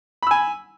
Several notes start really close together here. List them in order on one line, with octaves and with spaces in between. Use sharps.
B5 E6 G#5